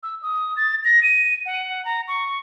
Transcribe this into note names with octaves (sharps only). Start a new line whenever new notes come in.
E6
D#6
A6
A#6
D#7
F#5
A#5
C#6